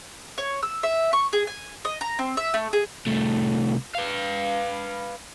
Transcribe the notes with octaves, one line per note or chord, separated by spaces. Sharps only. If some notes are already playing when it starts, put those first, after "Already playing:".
C#5
E6
E5
C#6
G#4
G#5
D#5
A#5
C4
E5
A3
G#4
C2 A3
B4 F5